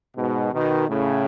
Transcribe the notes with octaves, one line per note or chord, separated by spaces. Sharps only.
G#2 B2
B2 D#3
A2 C#3